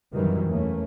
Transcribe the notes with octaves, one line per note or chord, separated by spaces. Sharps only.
F#2 C3 D#3 E3 F#3 G3
E2 E3 A3 A#3 C#4